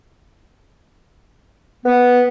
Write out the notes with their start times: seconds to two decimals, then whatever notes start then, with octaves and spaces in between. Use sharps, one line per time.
1.86 B3